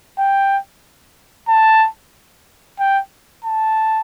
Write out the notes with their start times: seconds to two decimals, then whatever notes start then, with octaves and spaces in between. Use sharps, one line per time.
0.18 G5
1.48 A5
2.79 G5
3.44 A5